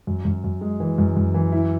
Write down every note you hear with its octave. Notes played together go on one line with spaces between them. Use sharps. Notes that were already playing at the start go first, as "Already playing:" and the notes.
F#2
F#2
F#2
G#3
E3
F#2
F#2
E3
E4